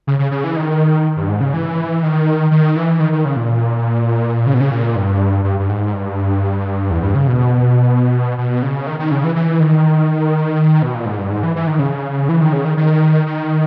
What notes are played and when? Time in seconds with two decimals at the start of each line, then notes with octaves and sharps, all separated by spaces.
0.07 C#3
0.19 C#3
0.31 C#3
0.44 E3
0.56 D#3
1.17 G2
1.29 G#2
1.41 C#3
1.54 E3
2.03 D#3
2.51 D#3
2.76 E3
3.00 D#3
3.12 D#3
3.25 C#3
3.36 A#2
4.46 C#3
4.54 B2
4.60 C#3
4.71 A#2
4.96 G2
5.44 G2
5.60 G2
5.69 G#2
5.93 G2
6.90 E2
7.03 G2
7.15 C#3
7.27 B2
8.38 B2
8.63 C#3
8.87 D#3
8.99 D#3
9.11 C#3
9.24 E3
9.36 E3
9.60 D#3
10.82 B2
10.95 A#2
11.06 G#2
11.19 G2
11.31 G#2
11.43 E3
11.56 E3
11.67 D#3
11.79 C#3
12.29 E3
12.41 D#3
12.53 C#3
12.65 D#3
12.77 D#3
13.26 D#3